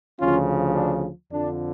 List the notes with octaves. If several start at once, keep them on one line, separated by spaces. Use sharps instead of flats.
D2 C#3 F3 C#4 F4
D4
F2 D3 F3 D4